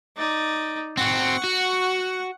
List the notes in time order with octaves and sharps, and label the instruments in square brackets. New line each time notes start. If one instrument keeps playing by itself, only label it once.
[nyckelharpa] D#4 D5
[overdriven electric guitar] C4 F#4 [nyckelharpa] F#5 C#6
[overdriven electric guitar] F#4